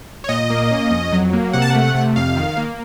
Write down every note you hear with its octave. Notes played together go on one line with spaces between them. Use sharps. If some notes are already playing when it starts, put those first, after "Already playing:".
C#5
A#2 D#5
A#3
C#4
F2
F#3
A#3
C3 F#5
A5
A3 F#5
C3
F2 F5
D#3
A#3